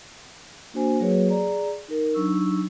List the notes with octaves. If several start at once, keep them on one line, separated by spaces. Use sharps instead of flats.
A#3 D4 F#4 C5 G#5
F#3 A#3 F#4 G#4 B4 C#5
G#4 D5 A#5
D#4 A#4
F#3 D4 D#4 C#6 E6